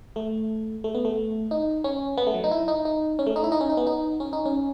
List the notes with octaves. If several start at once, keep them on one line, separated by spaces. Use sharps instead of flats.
A3
A3
B3
A3
D#4
C#4
B3
A3
F#3
D#4
E4
D#4
D#4
C#4
A3
D#4
E4
D#4
C#4
D#4
B3
D#4
C#4
D#4
C#4